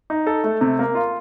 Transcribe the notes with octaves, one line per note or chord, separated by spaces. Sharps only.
D#4
A4
A3
C3
A#3
F4